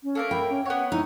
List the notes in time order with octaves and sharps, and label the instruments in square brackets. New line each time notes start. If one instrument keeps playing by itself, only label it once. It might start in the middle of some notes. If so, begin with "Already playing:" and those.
[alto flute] C#4
[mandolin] A3 A#3 A#4
[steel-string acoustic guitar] G5 [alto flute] B5
[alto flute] C#4
[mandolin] B3 C#5 [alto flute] F#5
[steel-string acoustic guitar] D#4 [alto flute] E4